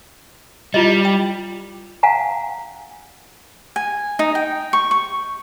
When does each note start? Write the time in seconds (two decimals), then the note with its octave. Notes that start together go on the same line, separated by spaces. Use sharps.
0.74 G3 E4 F4 D#5
1.05 G5
2.03 F5 F#5 G#5 A#5
3.76 G#5
4.19 D#4
4.35 G5
4.73 C#6
4.91 C#6